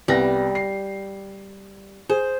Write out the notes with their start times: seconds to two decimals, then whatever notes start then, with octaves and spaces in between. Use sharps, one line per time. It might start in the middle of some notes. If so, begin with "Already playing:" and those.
0.08 C2 G3 B3 A#6
0.55 C7
2.10 G#4 C5